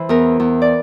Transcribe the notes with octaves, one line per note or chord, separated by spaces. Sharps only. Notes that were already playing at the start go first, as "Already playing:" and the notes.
Already playing: E3 C5
E2 A#4
E2
D5